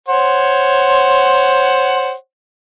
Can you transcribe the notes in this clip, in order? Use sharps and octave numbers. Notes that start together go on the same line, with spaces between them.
C5 C#5 F#5